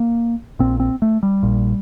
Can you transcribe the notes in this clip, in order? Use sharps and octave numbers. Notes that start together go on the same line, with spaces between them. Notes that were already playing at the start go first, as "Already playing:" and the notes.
Already playing: A#3
A#1 A#2 C4
C4
A3
G3
A#1 A#2